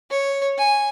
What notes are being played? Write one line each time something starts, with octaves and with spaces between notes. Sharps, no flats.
C#5
G#5